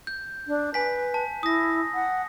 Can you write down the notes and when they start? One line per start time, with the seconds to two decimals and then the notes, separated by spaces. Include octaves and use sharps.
0.07 G6
0.47 D4
0.74 B4 G#5 B6
1.14 A5
1.43 E4 D#6 A#6
1.94 F#5